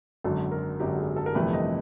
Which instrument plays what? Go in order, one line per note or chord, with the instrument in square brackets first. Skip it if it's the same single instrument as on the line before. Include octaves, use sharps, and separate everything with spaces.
[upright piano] G#1 F#2 D3 F#3 A4
A#4
G#1 F#2 D3 F#3 G4
G#4
A4
A#4
G1 F2 C3 E3 A3 B4
D#5